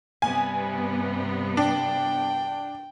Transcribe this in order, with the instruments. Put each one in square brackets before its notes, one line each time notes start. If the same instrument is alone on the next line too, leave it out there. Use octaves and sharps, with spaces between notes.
[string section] G2 C3 B3 [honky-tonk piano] G#5
[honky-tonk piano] D4 [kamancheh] G5